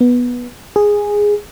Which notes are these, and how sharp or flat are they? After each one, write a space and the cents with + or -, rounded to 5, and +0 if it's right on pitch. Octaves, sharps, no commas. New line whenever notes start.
B3 -10
G#4 -5